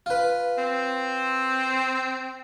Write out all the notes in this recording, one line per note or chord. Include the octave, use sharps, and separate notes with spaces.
F4 B4
C4